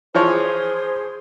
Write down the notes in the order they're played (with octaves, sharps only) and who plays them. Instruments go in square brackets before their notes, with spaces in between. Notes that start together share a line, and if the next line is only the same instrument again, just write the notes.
[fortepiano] E3 F3 C#5 [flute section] G#4 C5 C6